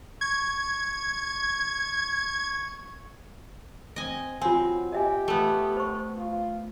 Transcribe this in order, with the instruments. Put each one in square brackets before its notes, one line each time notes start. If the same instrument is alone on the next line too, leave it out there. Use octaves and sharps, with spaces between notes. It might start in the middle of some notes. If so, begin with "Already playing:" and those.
[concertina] C#6 [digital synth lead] G#6
[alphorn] C4 [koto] D#5 G#5
[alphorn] F#3 [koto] C4 [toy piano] F4 G#5
[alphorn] G4 [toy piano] D#5 E5 G#5
[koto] A3 B3
[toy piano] C5 C#6
[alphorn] F4